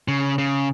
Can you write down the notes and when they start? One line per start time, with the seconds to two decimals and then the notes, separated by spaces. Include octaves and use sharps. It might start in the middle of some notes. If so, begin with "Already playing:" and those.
0.08 C#3
0.38 C#3